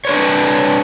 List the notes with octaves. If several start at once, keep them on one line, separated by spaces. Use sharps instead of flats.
D4 B4 C#5